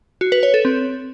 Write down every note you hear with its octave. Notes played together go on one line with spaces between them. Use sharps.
F#4
B4
C#5
A4
C4